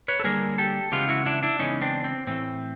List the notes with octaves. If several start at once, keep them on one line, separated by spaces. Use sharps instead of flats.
B4 C#5
A4
D3 G3 A#3 G#4 A#4
G4 A4
C#3 E3 G#3 B3 F4 G4
E4 F#4
D4 E4
D4 E4
C#3 E3 G#3 B3 C#4 D#4
C4 D4
C4
A2 E3 A3 C4